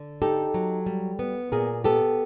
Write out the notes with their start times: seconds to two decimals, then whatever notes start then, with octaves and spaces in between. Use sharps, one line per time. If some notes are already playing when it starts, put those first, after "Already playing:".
Already playing: D3
0.22 D#4 G4 A4
0.54 F#3
0.86 G3
1.19 B3
1.52 A#2 G#4 A#4
1.84 B3 G4 A4